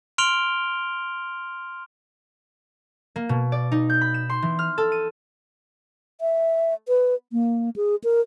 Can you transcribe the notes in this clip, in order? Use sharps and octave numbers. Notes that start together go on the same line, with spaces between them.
C6 F6 D7 F7 G7
A#3
B2
D5
D#4
G6
B5
E7
C6
E3
F6
A4
D#7
E5
B4
A#3
G#4
A#4